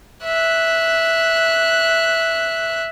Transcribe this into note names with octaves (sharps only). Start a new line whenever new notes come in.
E5 F#6